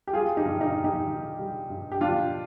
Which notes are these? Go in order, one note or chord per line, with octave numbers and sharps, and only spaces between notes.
G4
G3 F4 G#4
D#4 G4
G2
D#4 G4
G2
D#4 G4
D#3
G3
G2
G4
G2 D4 F4